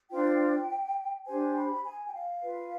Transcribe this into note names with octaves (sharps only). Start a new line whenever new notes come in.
D4 F4 C5 G5
D4 G4 C5 G#5
B5
G#5
G5
F5
F4 B4